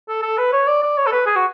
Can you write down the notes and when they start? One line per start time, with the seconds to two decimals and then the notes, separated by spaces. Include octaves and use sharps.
0.09 A4
0.23 A4
0.38 B4
0.53 C#5
0.67 D5
0.83 D5
0.98 C#5
1.06 A4
1.12 B4
1.26 G#4
1.36 F#4